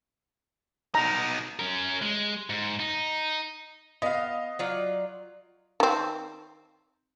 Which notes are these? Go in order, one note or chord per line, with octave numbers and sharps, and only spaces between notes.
B2 D#4 A#5
C#4 A#4
G#3
G#2
D#4
B3 D#5 F5
F#3 F4 D5
D#3 C4